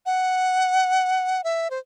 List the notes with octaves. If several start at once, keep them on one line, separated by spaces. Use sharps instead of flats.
F#5
E5
C5